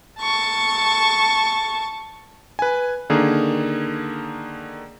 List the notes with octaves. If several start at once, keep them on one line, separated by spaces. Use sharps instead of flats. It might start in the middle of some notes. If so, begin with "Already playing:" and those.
A5 C#6
B4 G#5
D3 D#3 A#3 G#4